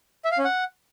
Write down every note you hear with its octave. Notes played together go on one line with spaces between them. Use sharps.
E5
F5
C#4
F#5